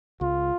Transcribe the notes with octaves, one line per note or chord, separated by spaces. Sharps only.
C#2 F4